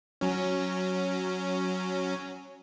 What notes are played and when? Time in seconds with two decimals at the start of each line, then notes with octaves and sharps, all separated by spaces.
0.21 F#3 C#4